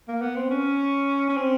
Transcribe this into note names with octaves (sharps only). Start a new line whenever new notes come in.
A#3
B3
C4
C#4
C#4
C4